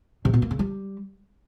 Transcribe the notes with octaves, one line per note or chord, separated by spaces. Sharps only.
C3
B2
A#3
C#3
G3